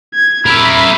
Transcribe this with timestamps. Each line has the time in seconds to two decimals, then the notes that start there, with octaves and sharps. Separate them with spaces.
0.14 G#6
0.46 A#4 E5 B5